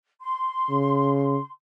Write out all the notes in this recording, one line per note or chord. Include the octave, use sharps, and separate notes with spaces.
C6
C#3